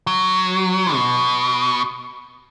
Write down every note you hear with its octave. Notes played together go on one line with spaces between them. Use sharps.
F#3
B2